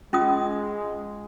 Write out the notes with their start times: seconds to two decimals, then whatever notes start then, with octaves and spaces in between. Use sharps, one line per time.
0.13 G#3 C#4 F4 D#6